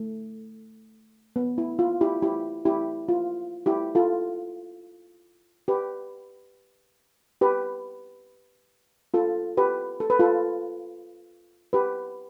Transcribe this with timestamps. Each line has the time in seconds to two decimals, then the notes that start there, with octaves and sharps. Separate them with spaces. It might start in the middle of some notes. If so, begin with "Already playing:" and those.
Already playing: A3
1.36 B3
1.58 E4
1.79 F4
2.01 E4 G4
2.22 E4 G4
2.65 E4 G4
3.09 F4
3.66 E4 G4
3.95 F4 A4
5.68 G4 B4
7.41 G4 B4
9.14 F4 A4
9.57 G4 B4
10.00 A4
10.10 B4
10.19 F4 A4
11.73 G4 B4